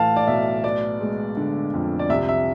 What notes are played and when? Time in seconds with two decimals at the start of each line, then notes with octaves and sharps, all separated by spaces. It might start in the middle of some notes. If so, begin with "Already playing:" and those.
Already playing: A2 E3 A3 F5 A5
0.16 D5
0.27 B1 E5
0.63 B3 D5
1.00 G#3
1.37 D3
1.74 F2
1.99 D5
2.09 C2 E5
2.29 E5